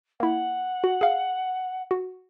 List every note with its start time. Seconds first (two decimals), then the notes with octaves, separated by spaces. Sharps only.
0.20 A#3 E4 F#5
0.84 F#4
1.01 G#4 F5
1.91 F#4